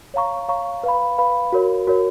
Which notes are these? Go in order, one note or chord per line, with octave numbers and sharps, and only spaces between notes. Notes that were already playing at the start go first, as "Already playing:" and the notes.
C#5 F5 A#5 C#6
C#5 F5 A#5 C#6
B4 F5 B5
B4 F5 B5
F#4 A#4 C#5
F#4 A#4 C#5